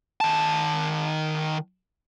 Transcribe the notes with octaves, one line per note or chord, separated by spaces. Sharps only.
D#3 A5